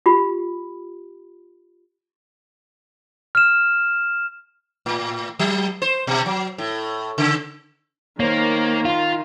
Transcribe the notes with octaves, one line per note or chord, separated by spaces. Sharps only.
F4 G4 B5
F6 E7
A2
F#3
C5
B2
F#3
A2
C#3
D#3 A#3 C5 C#5
F4 F5 C6